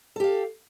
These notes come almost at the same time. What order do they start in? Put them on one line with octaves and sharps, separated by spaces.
A4 G4 F5